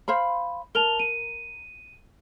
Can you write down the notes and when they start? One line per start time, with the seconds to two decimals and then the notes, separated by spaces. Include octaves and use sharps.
0.08 C5 F5 B5
0.75 A#4 A5 F7 G7
0.99 D#7